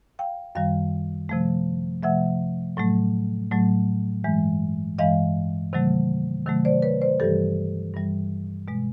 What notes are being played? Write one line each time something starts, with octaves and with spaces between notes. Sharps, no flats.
F5 G5
F#2 D#3 G3 F5 G5
C3 F3 A3
C3 F3 A3 E5 F#5
A2 F#3 A3
A2 F#3 A3
G2 E3 G#3
G2 E3 G#3 D#5 F5
C3 D#3 F#3 A3
C3 D#3 F#3 A3
C5 D5
B4 C#5
C5 D5
G2 E3 G3 G4 A4
G2 E3 G3
B2 G#3